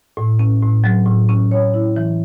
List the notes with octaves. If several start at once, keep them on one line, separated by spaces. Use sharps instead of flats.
A2
C#4
A2
F#3
A2
C#4
C#5
E4
E3